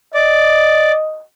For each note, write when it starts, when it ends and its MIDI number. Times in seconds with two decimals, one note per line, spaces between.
0.14 0.92 74
0.14 1.24 75